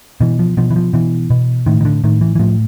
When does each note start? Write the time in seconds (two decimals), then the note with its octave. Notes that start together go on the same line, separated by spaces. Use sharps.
0.21 B2 E3
0.39 F3
0.57 B2 F3
0.71 E3
0.76 F3
0.93 B2 E3
1.30 B2
1.66 A2 D#3
1.81 D#3
1.85 D3
2.04 A2 D#3
2.21 E3
2.36 E3
2.39 A2 F3